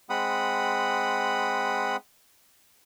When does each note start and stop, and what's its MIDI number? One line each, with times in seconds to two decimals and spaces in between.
0.10 1.96 56
0.10 1.96 60
0.10 1.96 78
0.10 1.96 83
0.10 1.96 87